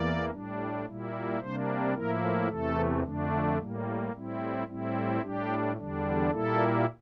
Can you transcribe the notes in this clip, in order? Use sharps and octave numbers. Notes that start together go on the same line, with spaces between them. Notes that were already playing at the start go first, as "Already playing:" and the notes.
Already playing: E2 E3 A#3 D5
A2 G3 D4
A#2 G3 A#3 E4
C3 G3 A#3 D4 C5
A2 F3 A#3 E4 A#4
E2 C3 E3 A3 A4
F2 D3 A3 D4
A2 G3 A#3
A2 G3 C4 E4
A2 G3 C4 E4
A2 G3 D4 G4
E2 D3 G3 D4
A#2 G3 A#3 E4 A4